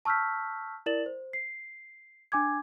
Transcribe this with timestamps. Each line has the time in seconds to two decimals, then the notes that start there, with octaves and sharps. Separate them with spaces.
0.05 A5 C#6 E6 F6 G6 B6
0.86 E4 A#4 D5 A6 E7 F#7
1.06 C5
1.33 C7
2.32 D4 G#5 D6 G#6